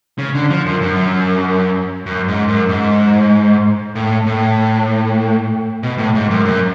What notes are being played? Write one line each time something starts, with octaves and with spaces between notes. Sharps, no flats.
C#3
D3
F3
F#2
F#2
F#2
G#2
F#2
G#2
A2
A2
B2
A2
G#2
F#2
F#2